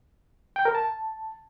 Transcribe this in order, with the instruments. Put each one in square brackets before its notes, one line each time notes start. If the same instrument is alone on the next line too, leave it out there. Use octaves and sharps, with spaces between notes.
[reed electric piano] G5
A#4
A5